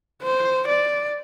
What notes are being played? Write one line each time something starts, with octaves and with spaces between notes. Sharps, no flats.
C5
D5